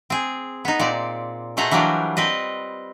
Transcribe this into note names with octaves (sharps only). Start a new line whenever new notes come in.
C4 G#4
B3 D#4
A#2 C4 D5
B2 A3 G#4 C5 F#5 A#5
E3 F#3 G3 D4 F4 A#4
C4 B4 D#5